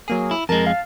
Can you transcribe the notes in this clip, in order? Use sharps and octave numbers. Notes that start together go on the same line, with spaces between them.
F#3 A#3 G#4
E4
F2 G#3 A#4 A5
F5